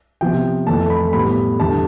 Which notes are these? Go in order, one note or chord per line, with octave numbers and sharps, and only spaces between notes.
C3 F3 B3 G5
F2 E3 A3 A5
B5
A2 G3 B3 B5
E2 D3 G3 B3 A5